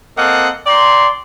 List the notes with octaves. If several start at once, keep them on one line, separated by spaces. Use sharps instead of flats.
A#3 C4 A4 D#5 F#5
D5 G5 A#5 C6